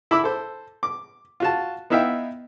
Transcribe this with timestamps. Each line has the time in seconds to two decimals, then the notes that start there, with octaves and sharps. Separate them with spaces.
0.11 E4 B5 D6 E6
0.24 A4 C5
0.83 D6
1.40 F4 F#4 A5
1.90 B3 D#4 E4 E5 F5 G5